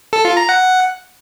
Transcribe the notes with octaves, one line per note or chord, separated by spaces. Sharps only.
A4
F4
A#5
F#5